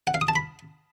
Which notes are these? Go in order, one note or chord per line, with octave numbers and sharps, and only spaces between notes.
F#5
F5
D#6
A5
B5